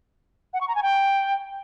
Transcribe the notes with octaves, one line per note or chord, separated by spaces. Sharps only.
F#5
C#6
A#5
G#5
G5